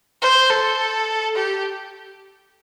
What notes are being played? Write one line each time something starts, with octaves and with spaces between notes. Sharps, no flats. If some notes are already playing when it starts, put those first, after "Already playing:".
C5
A4
G4